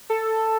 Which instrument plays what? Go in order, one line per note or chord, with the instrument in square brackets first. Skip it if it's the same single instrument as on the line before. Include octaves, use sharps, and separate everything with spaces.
[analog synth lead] A4